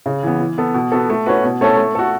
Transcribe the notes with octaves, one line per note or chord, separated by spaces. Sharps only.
C#3
E3 B3
E3
B3 A4
B2
B3 F#4 A4
A3
C#4 F#4 B4
B2
A3 C#4 A4
A3
F#4 A4